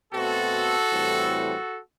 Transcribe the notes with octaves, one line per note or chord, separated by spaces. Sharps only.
B2 A3 C4 F#4 A4
A2 E3 G3 C4